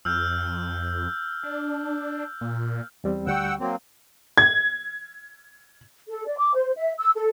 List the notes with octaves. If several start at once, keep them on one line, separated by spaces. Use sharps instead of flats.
F2 E6 F6 G6
D4
A#2
E2 G3 C4
D2 G3 F#5 G5 C#6 E6
F#3 A#3 C4
G#6
A4
D5
D6
C5
E5
E6
A4